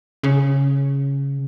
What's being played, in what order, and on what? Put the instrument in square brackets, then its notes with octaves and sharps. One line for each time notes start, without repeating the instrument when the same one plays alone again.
[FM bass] C#3